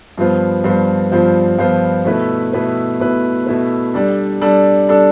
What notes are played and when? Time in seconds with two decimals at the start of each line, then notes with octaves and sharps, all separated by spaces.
0.18 G2 F3 B3 F4 C5
0.64 G2 F3 B3 F4 C5
1.11 G2 F3 B3 F4 C5
1.58 G2 F3 B3 F4 C5
2.05 B2 A3 E4 B4
2.53 B2 A3 E4 B4
3.00 B2 A3 E4 B4
3.46 B2 A3 E4 B4
3.94 G3 D4 A4
4.41 G3 D4 A4
4.88 G3 D4 A4